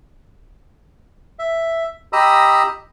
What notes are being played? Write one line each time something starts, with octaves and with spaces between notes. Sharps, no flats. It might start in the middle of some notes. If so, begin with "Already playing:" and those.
E5
G4 D#5 A#5 B5 D#6 E6